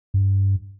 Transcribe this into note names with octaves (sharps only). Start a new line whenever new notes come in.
G2